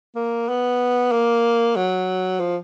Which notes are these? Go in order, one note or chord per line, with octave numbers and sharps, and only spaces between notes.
A#3
B3
A#3
F#3
F3